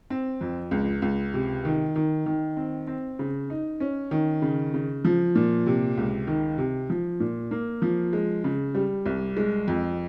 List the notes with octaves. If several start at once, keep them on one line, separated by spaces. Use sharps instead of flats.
C4
F2
C#2
C#2
C3
D#3
D#3
D#3
C4
C4
C#3
D#4
C#4
D#3
C#3
C#3
F3
A#2
C3
C#2
D#3
C3
F3
A#2
A#3
F3
G#3
C#3
G3
C2
G#3
F2